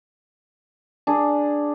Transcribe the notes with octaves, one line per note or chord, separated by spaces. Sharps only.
D4 G#4